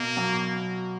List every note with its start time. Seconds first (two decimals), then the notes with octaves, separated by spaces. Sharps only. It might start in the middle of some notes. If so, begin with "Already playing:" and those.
Already playing: B2 A#3
0.17 F#3